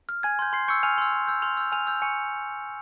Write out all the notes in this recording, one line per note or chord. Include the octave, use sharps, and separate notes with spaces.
F6
G#5 G#6
C6 G6
C6 C7
C#6 E6 G6 C#7
G#5 F6 F7
C6 E6
C6
E6 G6
C6 F6 F7
E6 G6
G#5 F6 F7
E6 G6
G#5 C#6 C#7